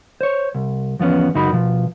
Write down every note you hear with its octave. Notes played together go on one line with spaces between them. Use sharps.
C5 C#5
C2
E2 F3 B3 C#4
C#2 F#2 D#4 F#4 B5
B2 F3